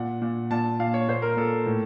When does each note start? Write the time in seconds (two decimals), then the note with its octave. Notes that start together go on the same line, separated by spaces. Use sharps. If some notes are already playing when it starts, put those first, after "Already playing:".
Already playing: A#2 F#5
0.22 A#2
0.51 A#2 A5
0.79 A#2 F5
0.94 C#5
1.08 A#2 C5
1.22 A#4
1.37 A#2 A4
1.66 A2